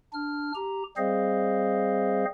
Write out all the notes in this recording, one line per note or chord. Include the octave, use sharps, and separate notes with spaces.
D4 F6
G4 A#5
G3 C4 G#4 C5 D#5 F5